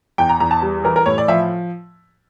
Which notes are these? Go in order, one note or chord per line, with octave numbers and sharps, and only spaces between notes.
E2 G5
A#5
E2 A#5
A5
G3
E3 A#4
A#4
A2 C#5
D5
F3 E5